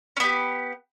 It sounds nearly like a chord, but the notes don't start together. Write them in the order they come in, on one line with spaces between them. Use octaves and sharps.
C#4 B3 G4